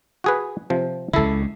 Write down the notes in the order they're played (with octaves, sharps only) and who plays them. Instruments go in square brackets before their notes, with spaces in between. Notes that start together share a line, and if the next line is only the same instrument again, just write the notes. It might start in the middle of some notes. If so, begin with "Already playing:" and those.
[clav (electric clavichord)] F#4 G#4 B4
C3 F3
[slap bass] C#2 C#3 [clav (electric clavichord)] E4 A4